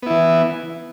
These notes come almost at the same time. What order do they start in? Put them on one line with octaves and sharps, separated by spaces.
B3 E4 E3